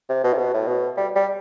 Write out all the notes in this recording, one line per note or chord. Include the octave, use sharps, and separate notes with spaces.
C3
B2
C3
B2
A2
B2
G3
G3